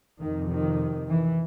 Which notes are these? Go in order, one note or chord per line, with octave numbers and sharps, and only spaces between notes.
F2 C3 D#3
D#3
E3